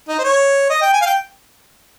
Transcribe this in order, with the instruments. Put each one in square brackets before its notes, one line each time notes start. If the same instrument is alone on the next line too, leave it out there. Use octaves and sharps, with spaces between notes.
[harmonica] D#4
C5
C#5
D#5
G5
G#5
F5
G5